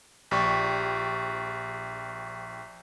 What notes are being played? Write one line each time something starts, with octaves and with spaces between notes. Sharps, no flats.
A#1 G4 D5 C#6